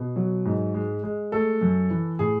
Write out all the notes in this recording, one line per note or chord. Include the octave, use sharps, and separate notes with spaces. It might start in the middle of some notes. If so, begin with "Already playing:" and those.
Already playing: B2
F#3
G#2
G#3
G#3
A3 A4
F#2
E3
A2 G#4